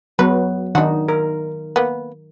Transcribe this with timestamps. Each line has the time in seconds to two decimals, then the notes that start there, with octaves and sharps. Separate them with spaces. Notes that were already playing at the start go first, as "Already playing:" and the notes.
0.19 F#3 B3 B4
0.75 D#3 D4 D#4 F#4
1.08 A#4
1.76 A#3 B3